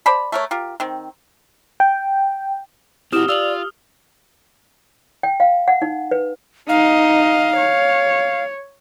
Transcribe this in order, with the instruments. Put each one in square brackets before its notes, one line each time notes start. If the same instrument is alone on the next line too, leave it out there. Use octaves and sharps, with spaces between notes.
[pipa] C5 D5 A5 B5
A3 A#4 C#5
F4 G4 A#4
D#3 C4
[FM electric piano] G5
[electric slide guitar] C4 F#4 [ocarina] E4 [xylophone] G4 E7 [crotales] D#6 F6 G7
[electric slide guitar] F4 [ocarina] D5 [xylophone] E6 F7 F#7
[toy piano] G5
F5
F#5
D#4
B4
[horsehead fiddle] D#4 D#5 [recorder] F5
[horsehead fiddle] C#5